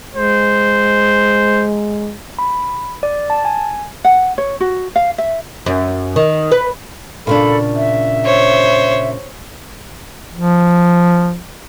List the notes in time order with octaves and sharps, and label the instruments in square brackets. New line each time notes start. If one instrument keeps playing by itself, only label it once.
[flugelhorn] G#3 [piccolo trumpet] C5
[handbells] B5
D5
A5
G#5
[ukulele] F#5
C#5
F#4
F5
E5
[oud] F#2
D#3
B4
[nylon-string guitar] A#2 C#3 D4 [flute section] A4 B5
[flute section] E5
[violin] C5 C#5
[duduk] F3